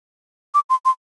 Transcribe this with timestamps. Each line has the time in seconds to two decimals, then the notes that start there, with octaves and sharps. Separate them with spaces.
0.54 D6
0.70 C6
0.85 C6